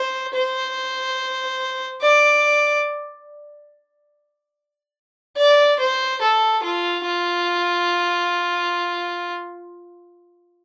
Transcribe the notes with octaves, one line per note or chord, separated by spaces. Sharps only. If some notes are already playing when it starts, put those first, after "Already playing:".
Already playing: C5
C5
D5
D5
C5
A4
F4
F4